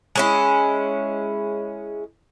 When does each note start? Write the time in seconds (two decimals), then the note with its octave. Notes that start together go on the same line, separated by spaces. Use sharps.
0.15 G#3 C#4 E4